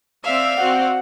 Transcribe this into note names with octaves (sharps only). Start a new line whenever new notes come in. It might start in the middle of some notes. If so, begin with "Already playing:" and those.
C4 D5 E5 F5
C4 F#4 F#5